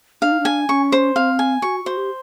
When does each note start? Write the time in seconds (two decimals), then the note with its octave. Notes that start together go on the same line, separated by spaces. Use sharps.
0.22 D4 F5
0.32 D#4
0.40 D4
0.45 G#5
0.69 C#4 C#6
0.92 C5
1.15 C4 F5
1.39 G#5
1.62 F#4 C#6
1.84 F#4 C5
1.97 G4